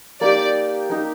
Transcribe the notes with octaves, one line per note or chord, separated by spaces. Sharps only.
A#3 D#4 G4 D5
A#3 D#4 G4